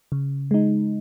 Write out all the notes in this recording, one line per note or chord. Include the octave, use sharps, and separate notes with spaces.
C#3
G#3 D#4